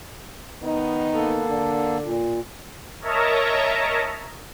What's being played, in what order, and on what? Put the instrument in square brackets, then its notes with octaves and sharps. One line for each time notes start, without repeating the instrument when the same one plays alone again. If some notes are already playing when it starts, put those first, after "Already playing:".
[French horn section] D#3 B3 D#4
[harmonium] A#3 A4
[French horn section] D3 D4
[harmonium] A#2
[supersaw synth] A#4 C#5 D#5 E5 A5 A#5